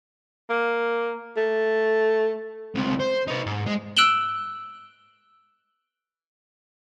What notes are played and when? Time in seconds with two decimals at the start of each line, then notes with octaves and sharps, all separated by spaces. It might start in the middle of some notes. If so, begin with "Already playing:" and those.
0.50 A#3
1.37 A3
2.75 C#2 C3
3.00 C5
3.28 D#4 B4
3.46 G#2
3.66 G#3
3.97 E6 F#6 D7 E7 F#7 G7